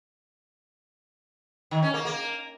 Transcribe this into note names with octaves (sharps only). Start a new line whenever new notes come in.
D#3
C#4
A#3
A#3